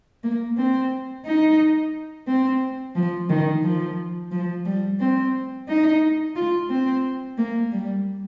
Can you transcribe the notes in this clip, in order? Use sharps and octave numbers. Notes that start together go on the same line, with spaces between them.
A#3
C4
D#4
C4
F3
D#3
F3
F3
G3
C4
D#4
F4
C4
A#3
G3